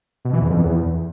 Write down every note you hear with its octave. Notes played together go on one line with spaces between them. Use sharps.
B2
E3
E2
F2
E2